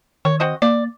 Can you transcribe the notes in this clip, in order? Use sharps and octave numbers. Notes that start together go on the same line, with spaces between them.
D#3 C#5
C4 F#4 D#5
A#3 D5